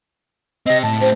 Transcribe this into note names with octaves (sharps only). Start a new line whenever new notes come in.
C4 G4 D#5
A2 A5
A2 G4 C5